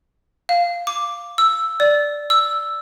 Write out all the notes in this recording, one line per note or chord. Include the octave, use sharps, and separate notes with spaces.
F5
D6
E6
D5
E6